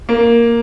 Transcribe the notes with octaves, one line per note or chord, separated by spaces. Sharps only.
A#3